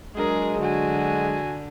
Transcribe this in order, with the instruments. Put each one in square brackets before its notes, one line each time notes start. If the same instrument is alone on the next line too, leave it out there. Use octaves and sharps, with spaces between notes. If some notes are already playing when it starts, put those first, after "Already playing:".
[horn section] F#3 G#3 [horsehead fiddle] D4 A#4 [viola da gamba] G#4
[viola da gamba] D3 [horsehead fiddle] F#4 G#5